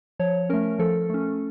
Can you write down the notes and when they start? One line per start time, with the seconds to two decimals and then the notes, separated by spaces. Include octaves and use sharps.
0.19 F3 C#5
0.49 A3 C#4 A#4
0.79 F3 A4
1.10 A3 C#4